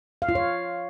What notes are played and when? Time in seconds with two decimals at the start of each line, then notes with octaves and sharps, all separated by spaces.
0.22 F5
0.29 F4
0.35 C#5